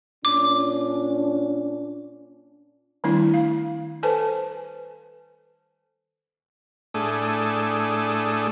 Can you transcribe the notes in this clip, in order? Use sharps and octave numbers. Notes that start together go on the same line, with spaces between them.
A#2 C#4 D4 D6
D#3 G3 A3 C4 D4 E4
F5
A4 B4 C5 G#5 A5
A2 A3 D4 G#4 D#6